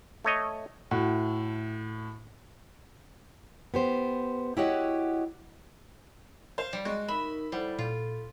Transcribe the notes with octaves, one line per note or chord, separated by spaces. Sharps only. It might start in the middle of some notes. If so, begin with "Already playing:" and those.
A3 C#5 D#5
A2 F#4 F#5
B3 G4 C5
E4 F#4 G4 C#5 D#5 F#5
C5 F5
G3
G#3 F#4
D#4 A#4 E5 B5
G3 E4 A4 C5 F#5
A#2 F4 A4